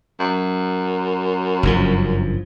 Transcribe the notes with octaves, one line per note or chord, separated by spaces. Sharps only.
F#2
F#1 G2 F3